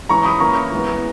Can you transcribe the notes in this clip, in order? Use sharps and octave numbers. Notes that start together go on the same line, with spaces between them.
E3 G#3 C#4 A#5 C#6
B5 D#6
E3 A#3 C#4 A#5 C#6
E3 G#3 B3